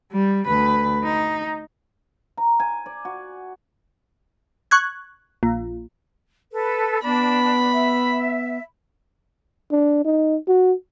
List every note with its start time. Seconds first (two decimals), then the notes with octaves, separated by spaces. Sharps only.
0.12 G3
0.47 D2 B4
1.04 D#4
2.37 A#5
2.60 G#5
2.86 D5
3.05 F#4
4.71 C#6 F#6 G#6
5.43 A#1
6.52 A4 B4
7.04 B3 D4 B5
7.73 E5
9.71 D4
10.05 D#4
10.47 F#4